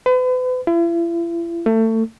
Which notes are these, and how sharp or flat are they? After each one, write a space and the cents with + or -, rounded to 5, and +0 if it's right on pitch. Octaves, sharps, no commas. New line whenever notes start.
B4 +40
E4 +40
A3 +25